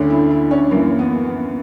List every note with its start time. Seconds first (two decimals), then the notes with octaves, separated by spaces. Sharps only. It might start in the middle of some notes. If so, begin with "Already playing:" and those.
Already playing: D2 D3 C#4
0.10 E4
0.31 E4
0.51 C#4
0.71 F#2 E3 A#3
0.99 B3
1.26 B3